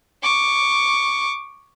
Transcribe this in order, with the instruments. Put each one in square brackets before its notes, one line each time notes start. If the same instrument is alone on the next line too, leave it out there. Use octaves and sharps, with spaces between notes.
[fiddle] C#6 D6